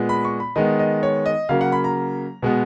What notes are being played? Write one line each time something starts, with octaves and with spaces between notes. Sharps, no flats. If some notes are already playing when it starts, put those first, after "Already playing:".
Already playing: A#2 G#3 B3
B5
C#6
B5
D#3 G#3 B3 D#5
D#5
C#5
D#5
C#3 F#3 A#3 F5
F#5
B5
A#5
B2 G#3 B3